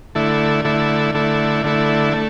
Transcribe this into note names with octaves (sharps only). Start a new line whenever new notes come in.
D3 A3 E4
D3 A3 E4
D3 A3 E4
D3 A3 E4
A3